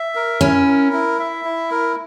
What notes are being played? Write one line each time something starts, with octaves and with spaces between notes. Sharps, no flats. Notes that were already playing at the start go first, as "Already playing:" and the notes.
Already playing: E5
A#4
C#4 E4
A#4
E4
E5
E4
A#4